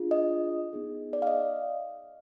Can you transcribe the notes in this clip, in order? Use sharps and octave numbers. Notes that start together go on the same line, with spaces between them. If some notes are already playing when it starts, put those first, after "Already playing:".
Already playing: D4 F4 G#4
D#5
B3 D#4 G#4
D5
F5
D#5